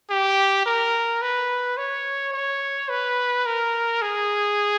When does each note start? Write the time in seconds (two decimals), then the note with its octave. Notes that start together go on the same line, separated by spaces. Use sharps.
0.10 G4
0.66 A#4
1.22 B4
1.78 C#5
2.34 C#5
2.89 B4
3.46 A#4
4.02 G#4